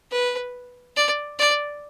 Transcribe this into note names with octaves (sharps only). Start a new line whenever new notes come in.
B4
D5
D5